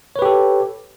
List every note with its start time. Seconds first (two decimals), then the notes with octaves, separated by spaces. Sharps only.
0.16 C#5
0.19 B4
0.22 G4
0.25 A4